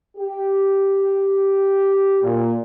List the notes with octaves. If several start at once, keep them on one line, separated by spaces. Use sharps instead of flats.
G4
A#2